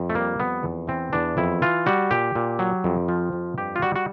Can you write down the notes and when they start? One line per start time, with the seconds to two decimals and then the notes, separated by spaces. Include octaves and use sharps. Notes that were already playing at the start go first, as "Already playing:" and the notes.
Already playing: F2
0.10 A3
0.14 G3 A#3
0.40 F2 B3
0.63 E2
0.87 E3 C4
1.13 E2 D4
1.37 F2 E4
1.62 E3 F4
1.86 G3 F#4
2.11 A#2 G4
2.35 A#2
2.59 F#3
2.84 F2
3.08 F3
3.33 F2
3.58 G2 G4
3.76 F4
3.82 G3 F#4
3.96 F#4